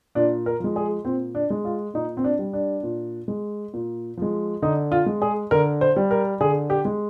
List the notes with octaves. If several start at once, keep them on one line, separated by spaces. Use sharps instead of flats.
A#2 D4
A#4
F3 G#3
G#4
A#2 C4
D4
G#3
F4
A#2 D#4
C4
D4
G3
D4
A#2
G#3
A#2
F3 G#3
D3 D#4
F4
G#3
G#4
D3 A#4
C5
G3
A#4
D3 G#4
G4
G#3